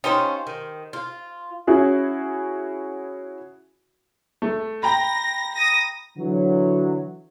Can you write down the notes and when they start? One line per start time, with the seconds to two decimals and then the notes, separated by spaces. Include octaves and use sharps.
0.04 C#4 D#4 F4 G4 C5
0.47 D#3
0.93 F4
1.67 C#4 E4 F#4 G#4
4.42 A3
4.83 G5 A#5 B5 A#6
5.53 D#6 A#6
6.17 D3 E3 F#3